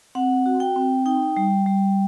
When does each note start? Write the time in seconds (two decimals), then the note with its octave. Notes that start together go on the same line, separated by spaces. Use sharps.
0.15 C4 F#5
0.46 F#4
0.60 G5
0.76 C4
1.06 D#4 G5
1.37 G3
1.66 G3